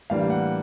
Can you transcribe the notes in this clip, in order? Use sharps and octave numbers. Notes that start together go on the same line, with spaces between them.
A2 E3 G3 A#3 D4 F5
F#5